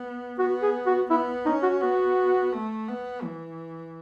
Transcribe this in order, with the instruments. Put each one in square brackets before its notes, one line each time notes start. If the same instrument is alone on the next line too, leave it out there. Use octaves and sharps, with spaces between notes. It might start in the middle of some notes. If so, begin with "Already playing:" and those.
Already playing: [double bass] B3
[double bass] B3 [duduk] F#4
[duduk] G#4
F#4
[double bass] B3 [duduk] E4
[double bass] C#4 [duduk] D#4
[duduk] F#4
[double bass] B3 [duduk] F#4
[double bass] A3
B3
E3